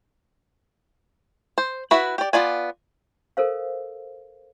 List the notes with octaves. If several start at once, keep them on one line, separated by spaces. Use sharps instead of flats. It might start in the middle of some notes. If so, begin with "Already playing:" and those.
C5
E4 F#4 B4 E5
G4 D5
B3 F4 D5 G#5
A4 A#4 C5 F5